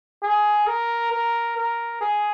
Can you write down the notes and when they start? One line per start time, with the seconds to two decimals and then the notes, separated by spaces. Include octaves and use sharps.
0.23 G#4
0.67 A#4
1.11 A#4
1.57 A#4
2.01 G#4